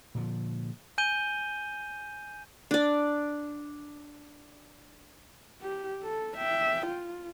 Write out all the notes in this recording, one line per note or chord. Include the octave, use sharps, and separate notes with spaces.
A#2 D3 F3
G#5 G6 D#7 G7
D4 D5
G4
A4
E5 G5
F4